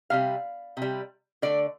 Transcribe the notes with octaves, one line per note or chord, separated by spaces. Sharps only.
C3 G3 F5
C3 G3
D3 A3 D5